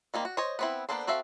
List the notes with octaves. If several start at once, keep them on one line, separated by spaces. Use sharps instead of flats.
D#3 G3 A#3 C4
F#4
C5 C#5 D#5
B3 C4 E4
A#3 B3 D4 A4 C5
C4 F#4 A4 E5 F5